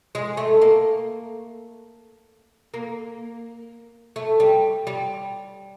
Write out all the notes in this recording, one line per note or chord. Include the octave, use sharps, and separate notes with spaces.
G#3
A3
A#3
A#3
A3
G3
G3